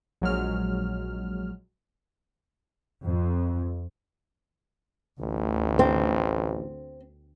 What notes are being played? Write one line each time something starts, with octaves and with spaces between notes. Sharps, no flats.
A#1 F#3 G#3 F6
F2
A1 D2
C4